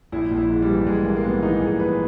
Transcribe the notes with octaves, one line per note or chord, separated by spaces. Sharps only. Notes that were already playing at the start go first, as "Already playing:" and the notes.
A#1 E4
A#1
E4
G#2
G3
E3
A#1 G#3
A#1 A#3
A#3
G#2 B3
E3 D#4
A#1 G#4
A#1 B4